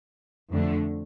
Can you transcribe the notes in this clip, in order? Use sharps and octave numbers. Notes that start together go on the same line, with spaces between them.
F2 D3 A3